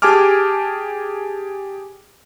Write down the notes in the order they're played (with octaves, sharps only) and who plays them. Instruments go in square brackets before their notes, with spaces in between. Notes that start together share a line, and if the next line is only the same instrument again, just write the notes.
[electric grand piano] G4 G#4 G#5 A5 D6 F6